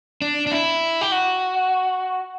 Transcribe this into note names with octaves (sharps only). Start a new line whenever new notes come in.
D4
D4
E4
G4
F#4